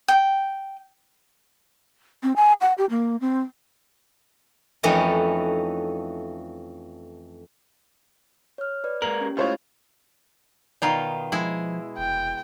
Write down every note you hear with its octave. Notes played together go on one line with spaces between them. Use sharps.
G5
C4
G#5
F#5
G4
A#3
C4
F2 E3 A3 C#4 D#4 E4
C#5 F6
B4 D5
G#3 A#3 A#4 F#7
C#4 G4
C#2 A2 F4 C5 C#5
B2 D#3 F4 D5 A#5
F3 G#3 E4
F1 G5